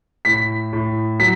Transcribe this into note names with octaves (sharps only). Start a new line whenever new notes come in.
A2 B6
A2
F#3 B6